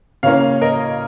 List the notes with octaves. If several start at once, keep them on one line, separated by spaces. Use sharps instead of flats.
C#3 A#3 C#4 C#5 F5
A#4 D#5